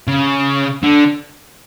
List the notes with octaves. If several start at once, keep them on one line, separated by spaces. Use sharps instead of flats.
C#3
D3